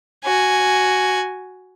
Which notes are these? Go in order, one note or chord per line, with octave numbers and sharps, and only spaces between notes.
F#4 G#5